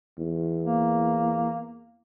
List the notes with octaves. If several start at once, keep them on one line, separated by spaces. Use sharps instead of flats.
E2
A#3